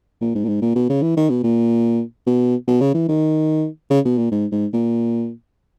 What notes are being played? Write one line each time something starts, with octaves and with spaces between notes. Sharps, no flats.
A#2
G#2
A#2
G#2
A#2
B2
C#3
E3
D#3
B2
A#2
B2
B2
C#3
E3
D#3
C#3
B2
A#2
G#2
G#2
A#2